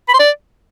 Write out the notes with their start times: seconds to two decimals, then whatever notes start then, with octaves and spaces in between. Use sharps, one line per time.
0.09 B5
0.14 C6
0.19 D5